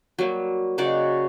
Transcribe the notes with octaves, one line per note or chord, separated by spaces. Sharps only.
F#3 G3 A#3
C#3 D#4 F#4 D5